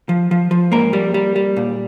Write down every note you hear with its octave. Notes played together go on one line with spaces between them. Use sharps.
F3
F3
F3
G#2 A#3 A#4
G3
G3
G3
A#2